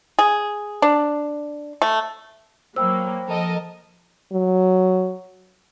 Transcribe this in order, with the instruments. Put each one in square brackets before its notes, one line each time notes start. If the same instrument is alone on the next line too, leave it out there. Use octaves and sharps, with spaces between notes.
[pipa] G#4
D4
A3
[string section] F#3 A#3 [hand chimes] C5 G5 B5 [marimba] E6
[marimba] F3 [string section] A4 A#4 D#5
[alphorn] F#3